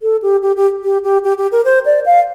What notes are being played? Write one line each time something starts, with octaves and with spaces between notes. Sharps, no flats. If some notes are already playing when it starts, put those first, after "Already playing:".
A4
G4
G4
G4
G4
G4
G4
G4
A#4
C5
D5
F5